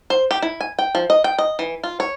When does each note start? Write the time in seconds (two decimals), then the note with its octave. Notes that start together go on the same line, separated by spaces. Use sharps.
0.10 C5
0.31 G4
0.42 E4
0.61 G#5
0.79 G5
0.95 F3
1.10 D#5
1.24 G5
1.38 D#5
1.59 E3
1.84 F4
2.00 C#5